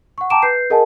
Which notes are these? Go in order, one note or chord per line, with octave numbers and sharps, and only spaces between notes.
F#5 C#6
G5 A5 A#5 D6 D7 E7
B4 G6 C7
G#4 A#4 D#5 F#5 G#5 A5